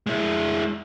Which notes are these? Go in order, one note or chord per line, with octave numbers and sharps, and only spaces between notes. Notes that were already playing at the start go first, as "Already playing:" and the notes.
G#3 E4